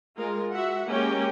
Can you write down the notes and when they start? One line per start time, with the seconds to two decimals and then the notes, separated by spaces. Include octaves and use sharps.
0.17 G#3 F4 A#4
0.53 F#4 E5 F#5
0.88 G#3 A#3 C#4 G4 A#4 G5